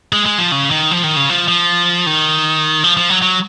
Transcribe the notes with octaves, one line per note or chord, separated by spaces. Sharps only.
G#3
G#3
F3
C#3
D#3
F3
D#3
C#3
F3
F3
D#3
F3
F3
F#3
F#3